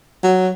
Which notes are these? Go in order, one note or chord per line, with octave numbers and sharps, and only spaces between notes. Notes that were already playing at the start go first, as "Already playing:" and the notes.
F#3